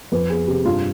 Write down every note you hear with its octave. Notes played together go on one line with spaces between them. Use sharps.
F2 B4
B3 G#4
C3 G4
G2 F4